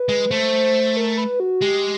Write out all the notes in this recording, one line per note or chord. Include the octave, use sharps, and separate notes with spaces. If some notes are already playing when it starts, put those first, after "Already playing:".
Already playing: B4
G#3
A3 C5
A#4
B4
F#4
G#3 G4